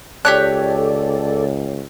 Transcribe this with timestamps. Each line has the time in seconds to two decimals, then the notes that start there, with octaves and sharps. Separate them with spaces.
0.25 C#2 G4 A4 C#5 D5 F#6